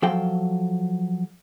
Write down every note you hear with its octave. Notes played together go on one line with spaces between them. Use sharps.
F3 F#3 A4 F5 G5